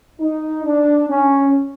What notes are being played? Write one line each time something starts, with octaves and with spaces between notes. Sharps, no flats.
D#4
D4
C#4